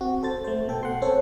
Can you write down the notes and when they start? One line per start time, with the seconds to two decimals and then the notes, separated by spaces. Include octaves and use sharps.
0.01 C4 F#4
0.23 A4 C5 A6
0.44 A3 C5
0.68 B2 A4 G5
0.83 F#5 C6
1.02 C4 C#4 A4 C5 C#5